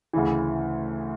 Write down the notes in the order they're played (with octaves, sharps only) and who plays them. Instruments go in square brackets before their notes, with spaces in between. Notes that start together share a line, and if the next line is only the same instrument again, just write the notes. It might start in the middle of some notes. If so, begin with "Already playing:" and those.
[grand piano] D2 C#3 E3